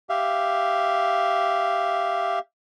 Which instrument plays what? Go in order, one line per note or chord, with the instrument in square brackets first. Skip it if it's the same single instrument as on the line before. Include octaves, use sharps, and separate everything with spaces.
[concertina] G4 E5 F5